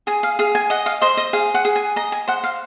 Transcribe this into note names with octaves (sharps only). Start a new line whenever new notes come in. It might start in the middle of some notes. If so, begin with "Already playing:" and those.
G#4 G#5
F5
G#4 F5
G#5
D#5 F#5
F5
C5 D#5
D#5
G#4 F5
F#5
G#4
G#5
D#5 A#5
G#5
C5 F#5
F5